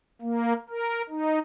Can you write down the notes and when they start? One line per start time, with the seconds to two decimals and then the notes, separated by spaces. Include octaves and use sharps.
0.22 A#3
0.70 A#4
1.10 D#4